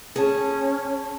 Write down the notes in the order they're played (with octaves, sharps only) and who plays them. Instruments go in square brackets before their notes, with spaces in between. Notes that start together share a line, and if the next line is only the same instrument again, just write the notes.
[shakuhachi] C#4 [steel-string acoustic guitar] G#4 A5